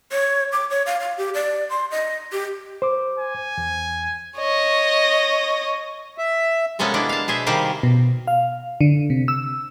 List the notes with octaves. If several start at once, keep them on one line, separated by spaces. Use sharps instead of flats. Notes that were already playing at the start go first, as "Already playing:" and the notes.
C#5
D6
C#5
F5
F5
G4
D5
C6
D#5
G4
C5 D6
G#5
E2
C#5 D#5
E5
C3 G#3 A#3 B3 C#4 A4
G#3 D4 E4 D5
F5 A5
B2 G#4 C5 E5
C3 D#3 G3 A#3 G4 C5
B2
F5
D3
C3
E6